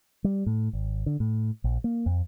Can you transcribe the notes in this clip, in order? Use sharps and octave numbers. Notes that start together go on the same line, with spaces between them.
G3
A2
G#1
D3
A2
A#1
A#3
F2